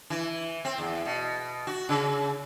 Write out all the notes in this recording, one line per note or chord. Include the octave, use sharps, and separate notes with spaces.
E3
C4
E2
B2
F#4
C#3